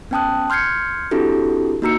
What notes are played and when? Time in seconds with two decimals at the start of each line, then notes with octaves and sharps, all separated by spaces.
0.11 B3 C#4 G5 A5 D#6 F#6
0.50 C6 F6 G6 G#6 C7 C#7
1.11 C4 D4 E4 F#4 G4 A4
1.82 A#3 D#4 F#4 A#5 E6 C#7